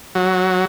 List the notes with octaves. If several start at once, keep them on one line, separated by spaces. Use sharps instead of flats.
F#3